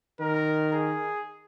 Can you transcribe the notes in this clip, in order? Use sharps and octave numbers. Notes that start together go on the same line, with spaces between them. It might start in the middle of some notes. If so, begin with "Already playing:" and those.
D#3 A#4
G#4